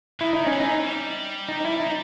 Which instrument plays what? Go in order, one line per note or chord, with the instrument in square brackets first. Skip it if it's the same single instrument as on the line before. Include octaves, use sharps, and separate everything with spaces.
[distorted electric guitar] D#3 [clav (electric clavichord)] E4
[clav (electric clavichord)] D#4
C#4
[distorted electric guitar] E3
[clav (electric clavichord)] D#4
[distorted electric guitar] G3
[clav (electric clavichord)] D#4
E4
D#4